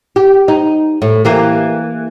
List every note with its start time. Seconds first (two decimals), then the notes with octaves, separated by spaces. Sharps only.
0.16 G4
0.48 D#4
1.02 A2
1.25 E3 A#3 G4